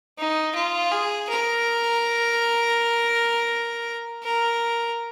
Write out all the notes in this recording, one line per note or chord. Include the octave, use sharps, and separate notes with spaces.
D#4
F4
G#4
A#4
A#4